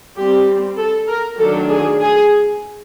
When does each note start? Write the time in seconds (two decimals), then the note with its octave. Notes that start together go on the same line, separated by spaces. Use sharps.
0.18 G3 C4 G4
0.78 A4
1.09 A#4
1.39 D#3 F#3 A3 D4 A4
1.70 G#4
2.00 G#4